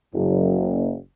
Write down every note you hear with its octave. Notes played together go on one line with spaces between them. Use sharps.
F#1